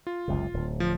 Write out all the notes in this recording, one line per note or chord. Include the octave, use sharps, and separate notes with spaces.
F4
F#1 C#2 C3
D1
F3